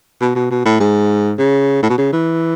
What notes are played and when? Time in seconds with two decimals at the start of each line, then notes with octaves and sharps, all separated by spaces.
0.21 B2
0.35 B2
0.50 B2
0.65 A2
0.80 G#2
1.39 C#3
1.82 A2
1.89 B2
1.98 C#3
2.12 E3